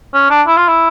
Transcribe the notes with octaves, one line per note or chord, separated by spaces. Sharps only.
C#4
D4
E4
F4
E4